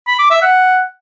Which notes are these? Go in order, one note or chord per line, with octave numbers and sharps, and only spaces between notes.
B5
D6
E5
F#5